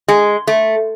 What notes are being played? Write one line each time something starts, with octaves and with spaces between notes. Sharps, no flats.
G#3
A3